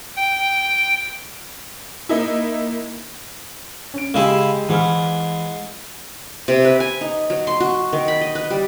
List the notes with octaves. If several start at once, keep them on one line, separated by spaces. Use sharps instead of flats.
G5
A#3 D#4 E4
C#4 D7
C#3 G#3 E4 G4
G#2 E3 B5 F6
C3
B4
G#5
D#4
F#3
C6
F#4
D#3
B5
D#5
B4
G3